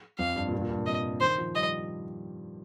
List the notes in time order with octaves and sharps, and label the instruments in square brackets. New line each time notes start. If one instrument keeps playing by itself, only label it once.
[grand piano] F2 [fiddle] F5
[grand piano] G2
A#2
G2
A#2
G2
A#2
[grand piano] C3 [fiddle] D#5
[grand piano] D#3 [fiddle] C5
[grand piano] F3
[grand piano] G3 [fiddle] D#5